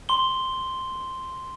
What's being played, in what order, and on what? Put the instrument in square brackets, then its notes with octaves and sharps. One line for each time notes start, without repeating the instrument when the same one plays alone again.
[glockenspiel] C6 G7